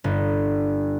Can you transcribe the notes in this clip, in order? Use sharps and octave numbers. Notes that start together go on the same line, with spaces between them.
G1